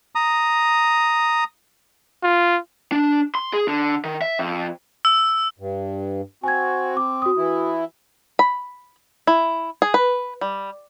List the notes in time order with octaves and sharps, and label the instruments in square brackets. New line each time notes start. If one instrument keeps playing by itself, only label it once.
[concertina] A#5 D#6
[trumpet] F4
[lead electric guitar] D4
C6
G#4
D3
D#3
E5
F2
[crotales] E6
[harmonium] G2
[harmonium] C4 F#4 [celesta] G#5 G#6
[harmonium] C4 [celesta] D6
[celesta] F#4 D#6
[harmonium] E3 E4
[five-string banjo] B5
E4
G#4
B4
G3